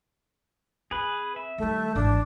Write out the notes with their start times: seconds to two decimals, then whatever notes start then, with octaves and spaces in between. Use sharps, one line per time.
0.91 C4 G#4 B4
1.36 E5
1.58 D#3 G3 A3
1.95 G#1 E3 D4